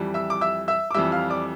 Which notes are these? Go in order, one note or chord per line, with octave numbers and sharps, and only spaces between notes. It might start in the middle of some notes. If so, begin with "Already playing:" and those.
Already playing: F2 E3 G3
E5 E6
D6
E5 E6
E5 E6
D6
F2 E3 G3 E5 E6
F5 F6
D5 D6